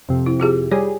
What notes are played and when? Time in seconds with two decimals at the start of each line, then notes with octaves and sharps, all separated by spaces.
0.09 F2 C3
0.26 E4
0.40 F4 G4 G#4
0.72 G3 G#4 C#5